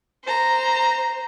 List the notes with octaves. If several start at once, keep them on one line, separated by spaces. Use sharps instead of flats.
C5 A#5